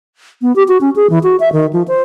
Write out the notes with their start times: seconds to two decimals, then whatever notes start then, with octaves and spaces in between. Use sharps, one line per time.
0.42 B3
0.56 G4
0.68 F#4
0.81 C#4
0.96 G#4
1.10 E3
1.23 F#4
1.40 E5
1.53 D#3
1.73 F3
1.88 C5